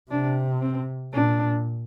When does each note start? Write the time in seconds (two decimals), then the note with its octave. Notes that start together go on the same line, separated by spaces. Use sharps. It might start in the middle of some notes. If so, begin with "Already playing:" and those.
0.11 C3 D4
0.62 C4
1.13 A#2 D4